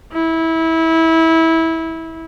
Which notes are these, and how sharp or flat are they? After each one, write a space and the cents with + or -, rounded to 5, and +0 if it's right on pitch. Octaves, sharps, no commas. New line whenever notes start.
E4 -20